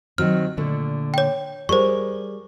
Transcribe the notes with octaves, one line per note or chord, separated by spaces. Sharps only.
D#3 F#3 C4 F6
A#2 D3 A3
C#5 G5
G3 G#4 A#4 C5 C#6